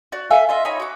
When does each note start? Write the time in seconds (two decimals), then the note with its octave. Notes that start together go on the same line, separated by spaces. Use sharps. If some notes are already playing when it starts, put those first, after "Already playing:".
0.12 F#4 D5
0.30 A4 E5 F5 G#5
0.49 F4 D#5 E5
0.65 D#4 C#5 G#5 B5
0.80 F#4 D6